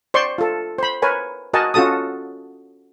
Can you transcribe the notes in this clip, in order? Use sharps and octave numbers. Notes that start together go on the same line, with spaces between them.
C5 D5 C6 C#6
F4 A4
C5 B5
A#4 B4 C#5 G#5
F#4 A#4 D#5 F#5 G#5 A5
C#4 F4 F#4 A4 A5 D#6